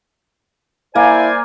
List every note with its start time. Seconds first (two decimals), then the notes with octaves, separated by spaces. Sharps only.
0.95 A#3 E4 C5 D5 G#5